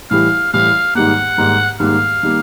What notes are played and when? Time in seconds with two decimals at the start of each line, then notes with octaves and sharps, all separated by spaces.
0.11 A2 E3 G3 F5
0.53 A2 E3 G3 F5
0.95 G#2 D#3 G3 A#3 F#5
1.38 G#2 D#3 G3 A#3
1.80 G#2 D#3 G3 A#3 F5
2.23 D#3 G3 A#3